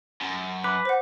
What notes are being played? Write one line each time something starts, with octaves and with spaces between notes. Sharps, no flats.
F#2
B4 D6
C5 F#5